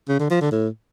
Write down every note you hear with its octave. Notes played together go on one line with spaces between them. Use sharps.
C#3
D3
F3
D3
A2